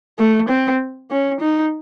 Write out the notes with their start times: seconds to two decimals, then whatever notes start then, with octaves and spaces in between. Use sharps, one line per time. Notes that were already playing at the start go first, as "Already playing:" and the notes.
0.19 A3
0.49 C4
1.11 C#4
1.41 D#4